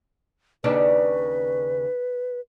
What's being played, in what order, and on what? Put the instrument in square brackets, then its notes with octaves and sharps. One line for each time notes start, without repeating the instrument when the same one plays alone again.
[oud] D#2 C#3 D4 [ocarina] B4